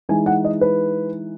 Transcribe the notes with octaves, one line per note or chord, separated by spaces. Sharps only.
E3 G#3 D#4 G#5
F#5
D#5
B4